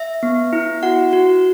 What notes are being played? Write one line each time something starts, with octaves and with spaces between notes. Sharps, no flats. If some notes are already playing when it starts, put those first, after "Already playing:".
Already playing: E5
B3
E4
F#4 F#5
F#4